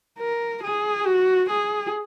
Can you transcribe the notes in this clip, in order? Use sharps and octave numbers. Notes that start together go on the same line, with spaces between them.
A#4
G#4
F#4
G#4